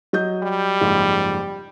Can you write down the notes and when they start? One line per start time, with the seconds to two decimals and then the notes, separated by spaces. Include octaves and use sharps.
0.13 F#3 D#5 G6
0.43 G3
0.81 F#1 G#2 F3